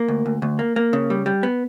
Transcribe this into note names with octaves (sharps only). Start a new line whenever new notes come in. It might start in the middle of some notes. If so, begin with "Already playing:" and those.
Already playing: A#3
D2
D2
D2
A#3
A#3
C#3
G3
G3
B3